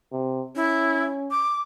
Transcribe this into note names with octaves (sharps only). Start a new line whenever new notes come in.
C3
C#4 E4
D6